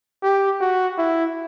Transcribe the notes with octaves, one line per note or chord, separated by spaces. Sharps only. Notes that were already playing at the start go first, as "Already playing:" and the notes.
G4
F#4
E4